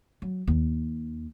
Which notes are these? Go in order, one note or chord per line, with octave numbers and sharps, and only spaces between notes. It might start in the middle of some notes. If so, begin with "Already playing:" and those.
F#3
D#2